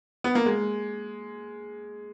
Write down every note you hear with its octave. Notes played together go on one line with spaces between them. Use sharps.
B3
A#3
G#3